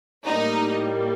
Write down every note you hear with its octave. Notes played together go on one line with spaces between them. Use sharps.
A2 G3 A#3 D#4